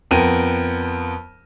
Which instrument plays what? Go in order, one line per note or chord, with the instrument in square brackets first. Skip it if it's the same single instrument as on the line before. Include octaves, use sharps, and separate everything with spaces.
[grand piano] F2 B3 A#4 G5 D#7